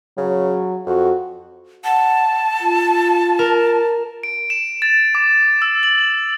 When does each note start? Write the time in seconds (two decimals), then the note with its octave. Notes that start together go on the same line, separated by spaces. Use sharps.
0.17 C#3 F#3
0.86 F2 F#4
1.84 F#5 A5
2.61 F4
3.39 A#4
4.23 D7
4.50 E7
4.82 A6
5.15 D6
5.62 E6
5.83 F#7